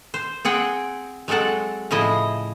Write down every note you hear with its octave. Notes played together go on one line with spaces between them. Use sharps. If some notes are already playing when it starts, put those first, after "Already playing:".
C5
C4 G#4 F#5 G5
F#3 G#3 C4 A4 F#5
A2 C#3 F3 E4 D#5